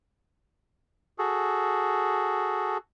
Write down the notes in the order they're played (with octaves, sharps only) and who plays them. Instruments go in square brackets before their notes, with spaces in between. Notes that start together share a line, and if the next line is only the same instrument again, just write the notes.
[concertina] F#4 G#4 A4